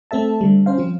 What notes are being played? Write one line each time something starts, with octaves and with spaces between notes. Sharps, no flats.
A3 C4 A4 E5 A5
D3 G3
C#4 C5 F5
F3 C4 F4